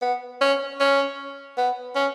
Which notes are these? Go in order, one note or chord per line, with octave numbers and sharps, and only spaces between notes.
B3
C#4
C#4
B3
C#4